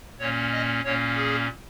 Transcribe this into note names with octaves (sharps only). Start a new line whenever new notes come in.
A#2 A#3 C#4 C#5
D#5
A#2 A#3 C#4 C#5
G#4